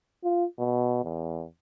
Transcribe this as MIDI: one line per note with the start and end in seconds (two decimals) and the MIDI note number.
0.24 0.45 65
0.59 1.00 47
1.04 1.44 40